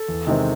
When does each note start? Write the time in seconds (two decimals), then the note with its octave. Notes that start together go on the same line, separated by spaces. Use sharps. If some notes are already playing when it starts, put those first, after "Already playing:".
Already playing: A4
0.08 E2
0.27 C3 D#3 G#3 C4